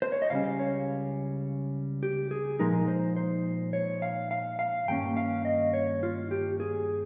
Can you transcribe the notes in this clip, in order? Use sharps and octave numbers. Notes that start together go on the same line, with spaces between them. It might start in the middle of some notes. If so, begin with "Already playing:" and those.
C5
C#5
D#5
C#2 C#3 G3 C#4 F5
C#5
G4
G#4
A#2 F3 G#3 D#4 A#4
C5
C5
C#5
F5
F5
F5
G2 D#3 A#3 C#4 G5
F5
D#5
C#5
F4
G4
G#4